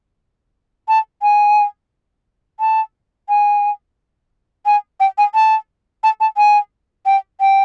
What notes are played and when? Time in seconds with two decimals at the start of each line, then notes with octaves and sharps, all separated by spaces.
0.88 A5
1.22 G#5
2.60 A5
3.29 G#5
4.66 G#5
5.00 G5
5.18 G#5
5.34 A5
6.03 A5
6.20 A5
6.37 G#5
7.06 G5
7.40 G5